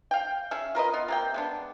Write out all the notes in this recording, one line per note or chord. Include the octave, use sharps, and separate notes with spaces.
F5 G5
C#4 G#4 E5
F4 A#4 B4 D#5
B3 F4
C3 A#3 G5
G#3 B3 D4